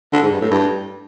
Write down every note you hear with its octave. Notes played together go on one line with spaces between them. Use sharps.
D3
G#2
G2
A2
G2